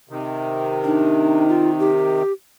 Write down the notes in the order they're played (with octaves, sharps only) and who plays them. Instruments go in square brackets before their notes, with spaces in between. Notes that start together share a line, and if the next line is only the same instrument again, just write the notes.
[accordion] C3 D#3
[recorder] D4 [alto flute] D#4
[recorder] F4
G4